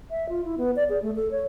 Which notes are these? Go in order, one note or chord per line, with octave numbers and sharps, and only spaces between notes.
E5
F4
E4
B3
D5
G#4
A3
A4
C#5